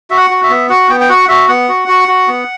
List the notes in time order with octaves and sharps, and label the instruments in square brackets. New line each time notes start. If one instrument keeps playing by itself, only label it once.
[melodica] F#4 E5
F#5
F#4
E5
B3
F#4 F#5
B3 G5
G5
F#4 F#5
F#4 E5
B3 F#5
F#4
F#4
F#4
B3